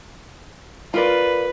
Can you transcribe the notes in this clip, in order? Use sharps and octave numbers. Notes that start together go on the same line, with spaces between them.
F4 A#4 B4 D5